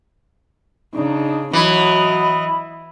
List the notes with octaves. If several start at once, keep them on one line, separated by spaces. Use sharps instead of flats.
C#3 D4 D#4
E3 F#3 D#5 B5